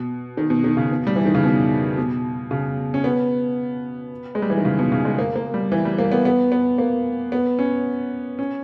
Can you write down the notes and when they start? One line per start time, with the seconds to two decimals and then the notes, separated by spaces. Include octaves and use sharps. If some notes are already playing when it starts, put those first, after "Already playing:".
Already playing: B2
0.37 D#3
0.50 B2
0.64 D#3
0.77 C#3
0.91 B2
1.07 G3
1.16 E3
1.25 D#3
1.35 C#3
1.44 B2
1.98 B2
2.51 C#3
2.94 C#4
3.04 B3
4.35 G#3
4.42 G3
4.50 E3
4.58 D#3
4.65 C#3
4.79 B2
4.92 C#3
5.05 G#3
5.19 A#3
5.36 A#3
5.54 G3
5.72 E3
5.85 G3
5.98 A#3
6.12 B3
6.25 B3
6.52 B3
6.78 A#3
7.32 B3
7.59 C#4
8.39 C#4